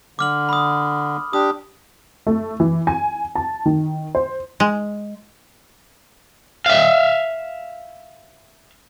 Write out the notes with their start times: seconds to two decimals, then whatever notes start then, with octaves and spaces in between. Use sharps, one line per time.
0.19 D3 D6 F6 F#7
0.49 B5 D#6
1.33 D4 G4 D#6
2.27 A3
2.60 E3
2.87 G#5
3.35 A5
3.66 D#3
4.15 C5
4.60 G#3
6.66 E5 F5